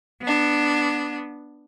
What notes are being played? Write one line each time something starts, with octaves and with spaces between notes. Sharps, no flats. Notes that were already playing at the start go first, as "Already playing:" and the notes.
B3 D4